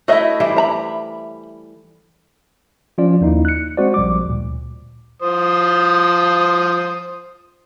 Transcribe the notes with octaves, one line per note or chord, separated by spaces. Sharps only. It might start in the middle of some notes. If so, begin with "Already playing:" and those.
A3 E4 F#4 D#5 E5
E3 G3 C5
E5 A#5 B5
F3 C#4 F4 D5
D#2 A#3 D#4 E4
F#6 C#7
G#3 C4 F#4 C5 D5
A#1 G3 D6
D2 A#2
F3 C5 D#6